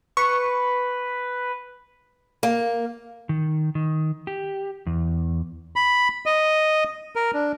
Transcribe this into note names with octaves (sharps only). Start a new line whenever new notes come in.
B4 C#6
A#3
D#3
D#3
G4
E2
B5
D#5
A#4
D4